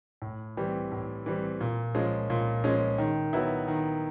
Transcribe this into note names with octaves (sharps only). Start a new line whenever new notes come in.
A2
E3 G3 C4
A2
E3 G3 C4
A#2
F3 G#3 C#4
A#2
F3 G#3 C#4
D#3
F#3 B3 E4
D#3